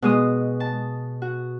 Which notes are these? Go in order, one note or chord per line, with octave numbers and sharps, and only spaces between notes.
B2 G#3 D#6
A5
F#4